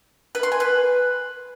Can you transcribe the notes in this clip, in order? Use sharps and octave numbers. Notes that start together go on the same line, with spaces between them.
B4
C6
G#5
B4